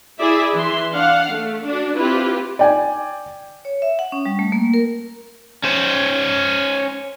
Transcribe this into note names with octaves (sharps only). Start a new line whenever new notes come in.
E4 G#4 D5 E5
E3 E5 C6
D4 F5 F#5
A3
D4 F#4
C4 E4 F4 G4 B4
D5 G5 G#5
C#5
E5
F#5
C#4
G3
A3
A#3
A#4
C#4 C5